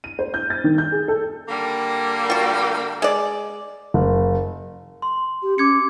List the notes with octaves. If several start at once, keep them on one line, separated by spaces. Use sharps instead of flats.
D#7
C5
G6
A6
D#3
G6
G#4
A4
D3 G3 A#3
F4 F#4
G#3 D5
F#1
C6
G4
C#4 D6 G#6 C#7